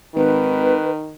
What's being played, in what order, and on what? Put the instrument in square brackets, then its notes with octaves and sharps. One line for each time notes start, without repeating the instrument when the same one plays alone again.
[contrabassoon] G#1 [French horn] D#3 [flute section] B4